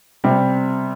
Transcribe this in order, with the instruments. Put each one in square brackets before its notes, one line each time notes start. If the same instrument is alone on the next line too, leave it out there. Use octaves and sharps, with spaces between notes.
[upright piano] C3 G3 C4